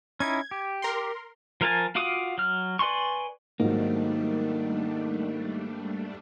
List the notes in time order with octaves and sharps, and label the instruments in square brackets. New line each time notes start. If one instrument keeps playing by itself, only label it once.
[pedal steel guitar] C#4 D#4 E4 [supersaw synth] G#6
[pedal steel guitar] G4
[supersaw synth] A#4 C6
[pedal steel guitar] F3 A#4 F5 G#5 A5
F4 F#4 F5 D6 D#6
F#3 F6
B4 D5 G#5 C6 C#6
[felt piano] G#2 F#3 [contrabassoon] D#3 [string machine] G3 A3 D4 [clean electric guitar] A#3